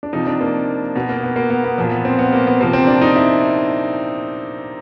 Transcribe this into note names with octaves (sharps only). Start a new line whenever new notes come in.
D4
C3 F3 D#4
D4
A#3
B2 B3
A#3
B3
A#3
B3
B3
A#2 F3
B3
C4
B3
A#3
B3
C3 F3 A#3
C4
D4
D#4
E4